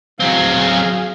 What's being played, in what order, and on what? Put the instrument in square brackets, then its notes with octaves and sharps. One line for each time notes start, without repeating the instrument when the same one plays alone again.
[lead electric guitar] F#3 C4 [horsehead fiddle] G#4 F5